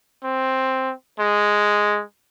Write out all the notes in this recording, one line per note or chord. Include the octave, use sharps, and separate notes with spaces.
C4
G#3